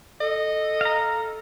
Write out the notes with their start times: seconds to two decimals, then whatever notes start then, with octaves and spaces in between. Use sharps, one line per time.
0.21 A4 D#5
0.81 F5 A#5